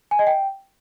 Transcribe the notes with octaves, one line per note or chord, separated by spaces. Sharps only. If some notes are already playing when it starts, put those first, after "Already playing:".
G#5
D#5
G5